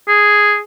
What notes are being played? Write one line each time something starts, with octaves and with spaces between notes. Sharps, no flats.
G#4